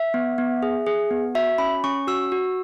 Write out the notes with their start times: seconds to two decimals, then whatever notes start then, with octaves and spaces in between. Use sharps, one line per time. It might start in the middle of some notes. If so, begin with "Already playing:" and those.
Already playing: E5
0.14 B3
0.38 B3
0.63 G#4
0.86 G#4
1.11 B3
1.35 F#4 E5
1.58 C#4 B5
1.84 C#4 C#6
2.07 F#4 E6
2.32 F#4